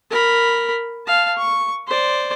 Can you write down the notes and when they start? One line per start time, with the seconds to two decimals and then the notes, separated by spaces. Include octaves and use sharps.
0.10 A#4 B5
1.06 F5 A5
1.37 C#6
1.87 C5 D5